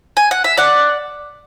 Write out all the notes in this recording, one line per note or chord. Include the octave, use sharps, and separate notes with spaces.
G#5
F#5
E5
D5 F#5